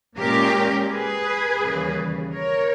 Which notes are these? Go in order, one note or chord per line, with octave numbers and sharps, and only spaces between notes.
A#2 G#3 C#4 G4 A#4
G#4 B4
D#2 C#3 E3 G3
A#4 C#5